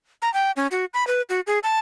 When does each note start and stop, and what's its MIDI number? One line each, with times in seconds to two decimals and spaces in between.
0.22 0.32 82
0.34 0.51 79
0.57 0.67 61
0.71 0.85 66
0.94 1.06 83
1.07 1.22 71
1.29 1.40 66
1.47 1.59 68
1.63 1.79 81